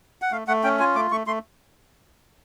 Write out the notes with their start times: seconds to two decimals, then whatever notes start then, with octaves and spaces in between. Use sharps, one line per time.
0.22 F#5
0.32 A3 F5
0.48 A3 F#5
0.64 C#4 G5
0.79 F4 G#5
0.95 A3 D6
1.11 A3 C#6
1.27 A3 C6